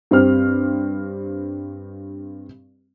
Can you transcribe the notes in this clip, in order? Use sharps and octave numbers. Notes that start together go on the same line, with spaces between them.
G2 C4 G4 F6